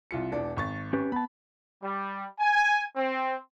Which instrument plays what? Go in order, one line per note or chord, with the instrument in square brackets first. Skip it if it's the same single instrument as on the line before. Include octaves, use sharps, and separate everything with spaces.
[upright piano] C2 F4 C#7
E1 D4
G#1 C#6 A6
[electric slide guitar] C#4 G4 B4
[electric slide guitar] B3 A5 [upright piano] B5
[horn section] G3
G#5
C4